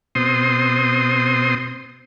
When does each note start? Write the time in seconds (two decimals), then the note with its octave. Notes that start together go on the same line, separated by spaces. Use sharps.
0.15 B2 C4 C6 D#6